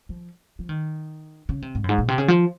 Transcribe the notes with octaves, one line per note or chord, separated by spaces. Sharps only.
F3
F3
D#3
C#3
C3
G#2
F#2
G#2
A#2
C3
C#3
F3